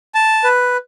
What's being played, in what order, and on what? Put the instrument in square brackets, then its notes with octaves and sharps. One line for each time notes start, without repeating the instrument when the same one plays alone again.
[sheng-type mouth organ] A5
B4